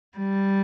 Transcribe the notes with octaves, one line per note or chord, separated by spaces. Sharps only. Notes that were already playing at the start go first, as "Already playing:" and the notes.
G3